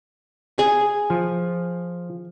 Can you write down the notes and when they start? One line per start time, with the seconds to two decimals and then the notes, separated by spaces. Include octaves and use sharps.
0.59 G#4
1.10 F3